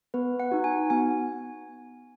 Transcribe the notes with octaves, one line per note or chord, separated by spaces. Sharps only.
B3 B4
F#5
D#4 F#4
G#5
B3 G#5